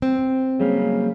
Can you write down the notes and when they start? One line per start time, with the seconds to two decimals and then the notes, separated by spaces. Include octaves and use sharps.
0.02 C4
0.60 C#3 F#3 G3 A#3